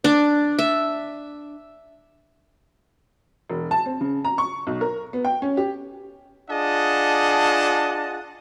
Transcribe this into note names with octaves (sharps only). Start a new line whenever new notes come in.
D4
E5
E1
A5
C4
C#3
A#5
C#6
B1
A#4
B3
G5
C#4
G4
D4 F4 G#4 D#5 F#5 A5